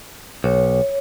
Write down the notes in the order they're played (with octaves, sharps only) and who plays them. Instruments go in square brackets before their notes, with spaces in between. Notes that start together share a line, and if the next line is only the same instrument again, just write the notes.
[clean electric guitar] B1 [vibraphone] C#5